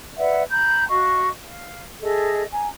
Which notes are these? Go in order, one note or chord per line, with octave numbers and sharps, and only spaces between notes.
B4 D5 E5 F#5
A#5 B5 G6
F#4 D#5 F5 C#6
F5
G#4 A4 D#5 E5
G#5 A#5